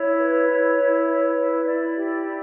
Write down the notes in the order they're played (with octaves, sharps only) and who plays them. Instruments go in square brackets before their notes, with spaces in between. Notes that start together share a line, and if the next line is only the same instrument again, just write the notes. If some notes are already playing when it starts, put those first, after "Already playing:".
Already playing: [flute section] E4 C#5
B4
E4
E4
B4
E4
E4 D5
G4
E4